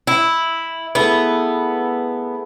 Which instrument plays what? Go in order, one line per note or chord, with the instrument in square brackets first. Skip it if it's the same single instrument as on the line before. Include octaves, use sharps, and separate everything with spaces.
[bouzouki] E4 [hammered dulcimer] E5 B5
[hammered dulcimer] A3 E4 G#4 [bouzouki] B3